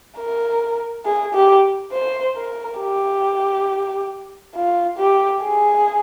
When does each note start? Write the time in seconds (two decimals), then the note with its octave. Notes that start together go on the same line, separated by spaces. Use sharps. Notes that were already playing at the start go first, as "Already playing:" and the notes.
0.18 A#4
1.06 G#4
1.35 G4
1.93 C5
2.37 A#4
2.81 G4
4.56 F4
4.98 G4
5.43 G#4